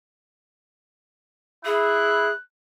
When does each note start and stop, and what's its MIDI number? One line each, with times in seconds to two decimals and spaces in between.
1.66 2.30 64
1.66 2.31 68
1.66 2.42 90